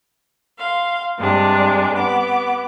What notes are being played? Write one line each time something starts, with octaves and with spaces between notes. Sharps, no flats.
F5 C6
G2 C3 G#3 D4
B3 D6